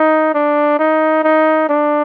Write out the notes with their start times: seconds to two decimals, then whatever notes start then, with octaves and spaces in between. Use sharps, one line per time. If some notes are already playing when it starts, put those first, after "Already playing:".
Already playing: D#4
0.34 D4
0.79 D#4
1.24 D#4
1.69 D4